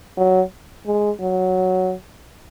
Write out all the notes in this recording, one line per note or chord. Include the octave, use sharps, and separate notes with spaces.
F#3
G#3
F#3